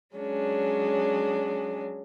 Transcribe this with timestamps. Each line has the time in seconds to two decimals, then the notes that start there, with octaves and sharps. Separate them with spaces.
0.14 F#3 G#3 C#4 D4